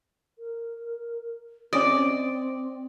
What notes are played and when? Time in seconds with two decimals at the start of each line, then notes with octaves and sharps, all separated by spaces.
0.38 A#4
1.73 C4 C#4 D5 D#5